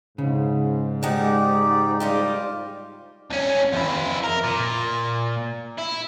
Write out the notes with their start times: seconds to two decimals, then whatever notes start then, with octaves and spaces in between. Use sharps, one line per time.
0.18 G#2 C#3
1.03 G#3 D#4 G4 D5 F#5
2.00 G3 D#4 F4 G4 D5
3.31 C2 C#4
3.73 F2 E4
4.24 A#4
4.44 A#2
5.78 E4